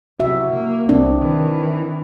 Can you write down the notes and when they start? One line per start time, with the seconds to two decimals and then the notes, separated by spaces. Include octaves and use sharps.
0.20 C3 F#4 E5
0.49 A#3
0.89 C2 C4 D4
1.20 D#3 E3